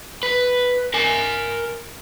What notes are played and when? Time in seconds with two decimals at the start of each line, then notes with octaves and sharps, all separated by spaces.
0.23 B4
0.94 A#4 G#5